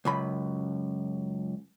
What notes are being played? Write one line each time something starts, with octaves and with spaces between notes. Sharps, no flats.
C#2 F#2 B5